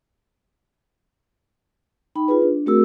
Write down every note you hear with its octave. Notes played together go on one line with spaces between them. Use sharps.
D#4 G5 B5
F4 G#4 B4
D4
A3 C4 F#4 G#4 A#4 E6